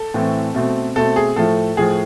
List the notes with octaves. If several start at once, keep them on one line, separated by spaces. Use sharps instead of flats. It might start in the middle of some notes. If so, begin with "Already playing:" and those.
Already playing: A4
A2 E3 A3 C4
B2 A3 C4
B2 A3 C4 A4
G#4
A2 F3 A3 A4
A2 F3 A3 G#4